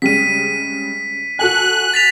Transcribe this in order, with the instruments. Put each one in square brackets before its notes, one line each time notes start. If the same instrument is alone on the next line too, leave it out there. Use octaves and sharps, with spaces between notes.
[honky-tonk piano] C#3 G3 G#3 [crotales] B6 D#7
[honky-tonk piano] F#4 A4 G#5 [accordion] F#6
[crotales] A6 B6 F7